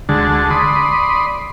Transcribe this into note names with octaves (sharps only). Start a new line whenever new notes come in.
D2 D3 G#3 A5
D5 B5 C6 D#6